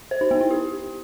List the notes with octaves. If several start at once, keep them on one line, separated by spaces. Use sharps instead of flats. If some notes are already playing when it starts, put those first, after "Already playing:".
C5
D#4
B3
E4
G4